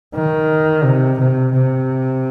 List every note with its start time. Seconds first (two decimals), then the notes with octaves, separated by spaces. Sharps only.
0.15 D#3
0.84 C3
1.18 C3
1.53 C3